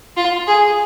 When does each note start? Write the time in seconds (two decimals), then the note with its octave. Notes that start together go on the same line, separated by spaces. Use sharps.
0.17 F4
0.47 G#4